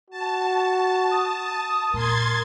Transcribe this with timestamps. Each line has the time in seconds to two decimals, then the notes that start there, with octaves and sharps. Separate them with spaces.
0.10 F#4 A5
1.12 D#6
1.94 A#2 A#4 C6 G#6 A6